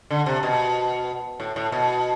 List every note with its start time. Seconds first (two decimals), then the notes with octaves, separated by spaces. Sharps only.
0.10 D3
0.26 C3
0.43 B2
1.40 A2
1.56 A2
1.72 B2